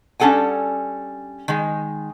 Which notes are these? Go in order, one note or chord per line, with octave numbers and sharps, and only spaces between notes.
G3 C#4 D4 A4 F#5 G#5
D#3 G#3